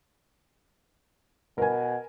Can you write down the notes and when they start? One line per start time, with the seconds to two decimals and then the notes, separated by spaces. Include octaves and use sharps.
1.58 B2 A#4 B4 G#5